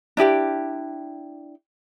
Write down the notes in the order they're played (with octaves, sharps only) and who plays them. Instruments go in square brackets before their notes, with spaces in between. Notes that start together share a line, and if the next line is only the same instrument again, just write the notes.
[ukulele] D4 E4 G4 G5